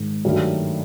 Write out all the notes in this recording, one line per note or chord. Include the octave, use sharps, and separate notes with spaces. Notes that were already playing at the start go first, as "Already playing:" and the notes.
Already playing: G#2 D#3 G#3
G2 D#3 F#3 A3